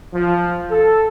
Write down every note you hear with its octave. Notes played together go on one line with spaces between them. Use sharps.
F3
A4